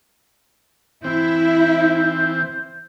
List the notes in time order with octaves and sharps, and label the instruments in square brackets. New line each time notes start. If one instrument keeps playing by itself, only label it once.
[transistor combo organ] E3 C4 [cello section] E4 [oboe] C5